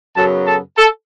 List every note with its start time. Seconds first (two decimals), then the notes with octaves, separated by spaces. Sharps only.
0.16 F#2 C#3 F#3 B3 A4 A5
0.46 A4 A5
0.77 A4 A5